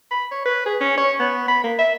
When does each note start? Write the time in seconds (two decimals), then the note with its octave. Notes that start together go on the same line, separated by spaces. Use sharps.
0.11 B5
0.31 C#5
0.45 B4
0.66 G#4
0.81 C#4
0.98 C#5
1.20 B3
1.48 B5
1.64 A#3
1.79 E5